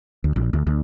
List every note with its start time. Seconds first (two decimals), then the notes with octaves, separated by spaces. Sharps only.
0.24 D2
0.36 A#1
0.53 D2
0.67 D2